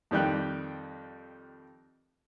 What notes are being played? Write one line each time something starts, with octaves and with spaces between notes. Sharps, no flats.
F2 D#3 G3 G5 F#6